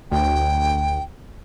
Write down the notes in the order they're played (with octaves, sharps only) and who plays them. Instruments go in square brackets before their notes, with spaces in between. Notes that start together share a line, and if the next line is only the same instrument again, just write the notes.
[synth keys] D2 [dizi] G5